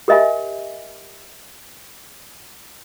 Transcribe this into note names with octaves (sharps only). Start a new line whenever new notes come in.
G4 A#4 D#5 E5 G#5